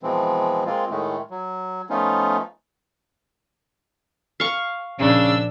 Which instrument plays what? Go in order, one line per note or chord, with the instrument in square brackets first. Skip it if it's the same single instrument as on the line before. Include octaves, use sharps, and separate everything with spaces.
[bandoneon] B2 E3 F3 G#3 C4
G#3 A#3 C4 F4
A2 D#3 G#3 A3
F#3
F3 A3 B3 C#4 D#4 F4
[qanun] F5 C#6
[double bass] A#1 [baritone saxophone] C#3 [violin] D4 E6